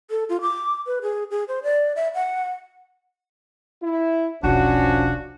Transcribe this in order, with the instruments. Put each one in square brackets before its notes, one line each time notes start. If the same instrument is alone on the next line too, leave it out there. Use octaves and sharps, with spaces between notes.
[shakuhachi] A4
F4
D6
B4
G#4
G#4
C5
D5
E5
F#5
[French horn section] E4
[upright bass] E1 B1 [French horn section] F3 C#4 [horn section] D4 F#4